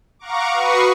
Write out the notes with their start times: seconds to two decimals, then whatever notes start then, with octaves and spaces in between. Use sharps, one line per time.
0.19 F5 F#5 A#5 C#6 D6
0.53 F#4 B4 C#6 D#6 C7